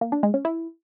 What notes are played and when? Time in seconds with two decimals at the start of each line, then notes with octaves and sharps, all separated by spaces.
0.01 A#3
0.12 D4
0.23 G#3
0.34 C#4
0.45 E4